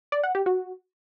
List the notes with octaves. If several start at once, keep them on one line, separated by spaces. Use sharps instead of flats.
D5
F#5
G4
F#4